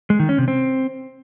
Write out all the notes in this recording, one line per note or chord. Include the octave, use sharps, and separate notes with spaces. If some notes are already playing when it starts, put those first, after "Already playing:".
G#3
D#3
C#4
C3
C4